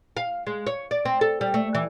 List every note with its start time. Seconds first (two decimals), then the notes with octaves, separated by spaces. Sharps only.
0.17 F5
0.47 G#3
0.67 C#5
0.91 D5
1.05 C4
1.21 A4
1.41 G3
1.54 A3
1.75 E3